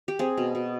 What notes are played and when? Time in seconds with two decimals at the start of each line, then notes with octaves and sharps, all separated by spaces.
0.08 G4
0.19 C4 G#4
0.37 B2
0.55 B2